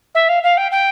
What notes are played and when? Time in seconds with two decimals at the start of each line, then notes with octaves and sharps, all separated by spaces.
0.15 E5
0.29 F5
0.43 F5
0.57 G5
0.72 G5